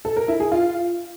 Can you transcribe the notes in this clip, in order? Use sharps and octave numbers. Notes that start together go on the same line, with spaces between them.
A4
A#4
E4
G#4
F4